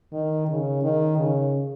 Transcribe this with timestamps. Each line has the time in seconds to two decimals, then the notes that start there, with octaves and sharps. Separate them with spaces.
0.13 D#3
0.48 C#3
0.83 D#3
1.18 C#3